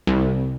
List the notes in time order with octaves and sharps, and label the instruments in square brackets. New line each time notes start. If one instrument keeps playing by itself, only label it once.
[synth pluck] C2